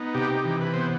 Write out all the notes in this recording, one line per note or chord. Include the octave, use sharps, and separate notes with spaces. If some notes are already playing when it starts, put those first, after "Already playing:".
Already playing: B3 D#4
C3 G4
E3
B4
B3 C5